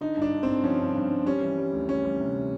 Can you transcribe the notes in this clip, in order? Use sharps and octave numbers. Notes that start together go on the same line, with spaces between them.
D3 D#4
G2 D4
D3
C4
G2
F3 C#4
G2
G2
G2
G3 C#4
E3
G3
D2
D2 C#4
G3
C3